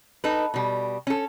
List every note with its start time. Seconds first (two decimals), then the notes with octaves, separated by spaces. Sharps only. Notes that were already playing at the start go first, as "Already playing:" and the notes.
0.24 D#4 A4 B4
0.54 B2 G3
1.07 C#4 A4